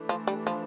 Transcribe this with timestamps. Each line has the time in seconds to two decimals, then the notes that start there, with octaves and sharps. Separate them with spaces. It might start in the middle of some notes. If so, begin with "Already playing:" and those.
Already playing: E3 A3 D4
0.09 F3
0.27 G3
0.47 F3